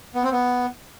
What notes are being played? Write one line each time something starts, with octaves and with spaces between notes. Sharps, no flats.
B3
C4
B3